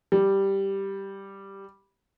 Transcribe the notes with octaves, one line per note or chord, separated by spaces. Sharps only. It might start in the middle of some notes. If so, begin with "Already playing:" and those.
G3